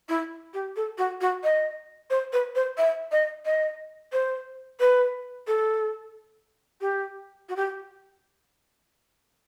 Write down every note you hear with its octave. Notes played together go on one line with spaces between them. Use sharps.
E4
G4
A4
F#4
F#4
D#5
C5
B4
C5
E5
D#5
D#5
C5
B4
A4
G4
F#4
G4